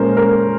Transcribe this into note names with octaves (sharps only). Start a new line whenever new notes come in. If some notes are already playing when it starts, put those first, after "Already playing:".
Already playing: A#2 G#3 C#4 A#4 C5
A#4